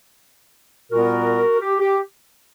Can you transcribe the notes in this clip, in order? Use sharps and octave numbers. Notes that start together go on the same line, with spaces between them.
A#2 G3 B3 F#4 A#4
G4
G4